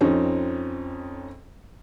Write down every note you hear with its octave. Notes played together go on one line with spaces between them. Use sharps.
F2 C4 C#4 D#4